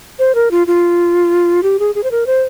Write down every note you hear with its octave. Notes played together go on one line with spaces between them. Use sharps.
C5
A#4
F4
F4
G4
G#4
G#4
C5
A#4
C5